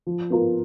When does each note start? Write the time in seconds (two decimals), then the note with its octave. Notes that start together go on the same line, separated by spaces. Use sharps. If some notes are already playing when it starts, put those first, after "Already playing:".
0.07 F3
0.30 B3 F4 A#4